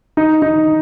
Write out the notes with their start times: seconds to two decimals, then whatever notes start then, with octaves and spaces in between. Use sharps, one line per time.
0.17 D#4
0.42 D#4